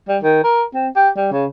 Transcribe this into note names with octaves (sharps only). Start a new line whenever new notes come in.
G3
D#3
A#4
C4
G4
G3
C#3